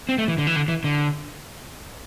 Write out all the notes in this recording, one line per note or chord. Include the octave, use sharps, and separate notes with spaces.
C4
A3
E3
D3
E3
D3
E3
D3